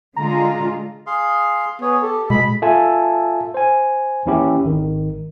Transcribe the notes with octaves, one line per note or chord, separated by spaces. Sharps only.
D3 G#3 F4 A#5
G#4 F5 C6
B3 G#4 C#5
G4 A4
B2 G#3 B3 B5
F4 A4 E5 G#5 A5
C5 G#5
D#2 E3 C#4 E4 G4
G#1 D#3